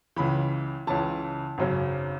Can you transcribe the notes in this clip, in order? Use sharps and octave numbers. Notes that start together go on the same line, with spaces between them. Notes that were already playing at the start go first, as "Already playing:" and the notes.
C#2 C#3 E3 B5
C#2 C#3 E3 A5
G#1 F#2 C#3 F#3